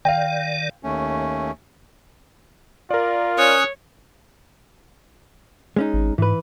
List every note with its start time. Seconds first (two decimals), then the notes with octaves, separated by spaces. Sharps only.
0.05 D#3 D5 F5 G5
0.83 D#2 A3 C#4
2.91 F4 A#4 D5
3.38 C#4 C#5 D#6 F#6
5.76 G#3 C#4 D#4
5.93 G#1
6.18 G#2 E3 B4